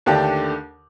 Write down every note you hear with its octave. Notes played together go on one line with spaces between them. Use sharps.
D#2 D3 A3 D4 G4